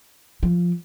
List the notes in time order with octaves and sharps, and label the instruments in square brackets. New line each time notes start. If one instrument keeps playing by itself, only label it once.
[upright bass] F3